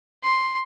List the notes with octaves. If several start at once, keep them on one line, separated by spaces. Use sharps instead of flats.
C6